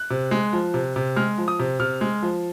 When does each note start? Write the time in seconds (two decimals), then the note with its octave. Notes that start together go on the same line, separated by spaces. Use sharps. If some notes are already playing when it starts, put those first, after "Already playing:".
Already playing: F#6
0.10 C3
0.31 G#3
0.53 F3
0.74 C3
0.96 C3
1.16 G#3 F6
1.38 F3
1.48 D#6
1.59 C3
1.80 C3 F6
2.01 G#3
2.23 F3